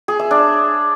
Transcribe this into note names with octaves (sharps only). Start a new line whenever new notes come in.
G#4
E5
D4